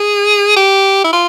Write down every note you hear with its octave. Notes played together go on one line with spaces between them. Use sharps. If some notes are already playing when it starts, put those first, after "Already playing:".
Already playing: G#4
G4
E4
F4